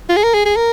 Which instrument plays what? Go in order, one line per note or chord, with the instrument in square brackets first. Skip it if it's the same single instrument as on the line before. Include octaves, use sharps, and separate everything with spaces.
[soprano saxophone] F4
G#4
A#4
G#4
G#4
A#4